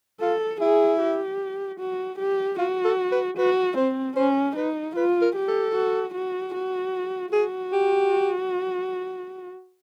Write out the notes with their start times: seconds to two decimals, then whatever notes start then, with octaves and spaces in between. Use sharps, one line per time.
0.21 F4 A4
0.61 E4 G#4
1.01 G4
1.80 F#4
2.19 G4
2.58 F4 F#4
2.85 A4
3.12 B4
3.38 F#4 B4
3.77 C4 C5
4.16 C#4 C5
4.56 D#4 B4
4.96 F4 B4
5.22 A#4
5.36 G4
5.48 A4
5.75 F#4
6.14 F#4
6.55 F#4
7.32 F#4 G#4
7.73 G4